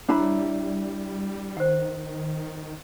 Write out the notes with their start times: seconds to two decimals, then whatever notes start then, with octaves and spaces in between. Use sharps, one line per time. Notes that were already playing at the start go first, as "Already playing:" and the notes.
0.09 G3 D4 E4 C#5 A#5 B5
1.57 D#3 C5 F#5